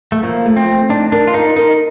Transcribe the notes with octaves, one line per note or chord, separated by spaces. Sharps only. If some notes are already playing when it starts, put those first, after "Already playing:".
A3
F3 A#3
A3
C4
A3
D4 D#4
D4 A#4
F4
D#4 A#4
D#4 A#4